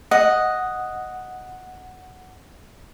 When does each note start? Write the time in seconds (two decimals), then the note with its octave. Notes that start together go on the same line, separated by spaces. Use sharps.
0.11 D#5 F#5